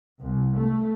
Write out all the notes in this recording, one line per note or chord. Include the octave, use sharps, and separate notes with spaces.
C2
A3